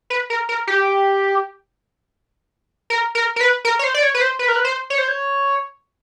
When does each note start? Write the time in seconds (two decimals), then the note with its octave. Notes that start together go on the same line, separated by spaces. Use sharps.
0.10 B4
0.30 A#4
0.49 A#4
0.67 G4
2.90 A#4
3.15 A#4
3.36 A#4
3.41 B4
3.65 A#4
3.79 C#5
3.84 C5
3.94 D5
4.03 C#5
4.14 B4
4.21 C5
4.39 B4
4.48 A#4
4.56 B4
4.65 C5
4.90 C#5
4.98 C5
5.08 C#5